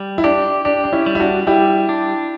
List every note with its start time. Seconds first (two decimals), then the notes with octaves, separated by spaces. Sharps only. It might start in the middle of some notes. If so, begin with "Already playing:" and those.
Already playing: G3
0.18 E4
0.24 D4 G4
0.65 D4 G4
0.84 D4
0.93 C#4 E4
1.06 G3
1.15 E4
1.20 D4 F#4
1.47 G3 E4 G4
1.89 D4